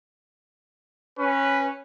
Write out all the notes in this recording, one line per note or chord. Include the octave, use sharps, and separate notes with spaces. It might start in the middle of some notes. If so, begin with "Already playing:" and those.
C#4 B4